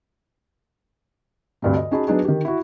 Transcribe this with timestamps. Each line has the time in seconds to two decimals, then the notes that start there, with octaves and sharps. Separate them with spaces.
1.62 D2 G2 C3
1.77 D#5
1.91 C#4 D#4 F#4 G#4 A5 B5
2.08 F#3 B3 D4 D#4 G#4
2.25 D#3 G4
2.45 E4 F#4